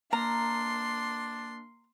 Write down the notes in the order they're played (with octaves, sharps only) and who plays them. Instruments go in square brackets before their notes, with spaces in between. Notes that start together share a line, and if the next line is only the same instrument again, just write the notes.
[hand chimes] A#3 F6 [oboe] D4 [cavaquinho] A#5 [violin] C6